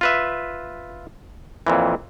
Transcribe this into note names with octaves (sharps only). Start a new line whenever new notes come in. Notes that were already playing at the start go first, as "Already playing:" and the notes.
F4 B4 E5
F2 A#2 E3